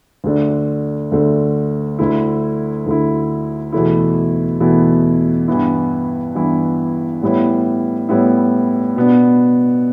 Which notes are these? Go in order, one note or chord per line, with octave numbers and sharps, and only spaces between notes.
D2 D3 A3 D4
D2 D3 A3 D4
D2 D3 A3 E4
D2 D3 A3 E4
E2 B2 A3 E4
E2 B2 A3 E4
G2 E3 B3 E4
G2 E3 B3 E4
A2 G3 B3 E4
A2 G3 B3 E4
B2 B3 D4